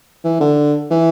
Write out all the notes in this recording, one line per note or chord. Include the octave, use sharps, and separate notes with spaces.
E3
D3
E3